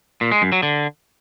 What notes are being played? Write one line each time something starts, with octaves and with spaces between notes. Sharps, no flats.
A#2
G#3
F#2
F#3
D3